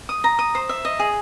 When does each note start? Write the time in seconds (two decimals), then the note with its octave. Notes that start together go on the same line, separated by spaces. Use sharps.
0.09 D#6
0.24 A#5
0.39 D#6
0.55 C5
0.69 E5
0.85 D#5
0.99 G#4